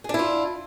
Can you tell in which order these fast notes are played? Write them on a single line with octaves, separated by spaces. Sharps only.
G#4 D4 E4 F4